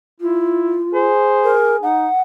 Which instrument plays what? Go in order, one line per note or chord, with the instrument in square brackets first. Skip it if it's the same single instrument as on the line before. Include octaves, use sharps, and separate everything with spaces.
[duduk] E4 [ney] F4
[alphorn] G#4 [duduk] C5
[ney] A#4
[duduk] D#4 [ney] F#5